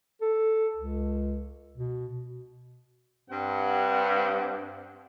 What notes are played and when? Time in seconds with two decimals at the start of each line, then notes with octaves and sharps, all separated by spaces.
0.21 A4
0.76 C#2
1.77 B2
3.30 G2 C4 F#5